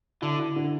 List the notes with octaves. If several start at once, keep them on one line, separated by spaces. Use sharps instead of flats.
D3 E4
E4
D3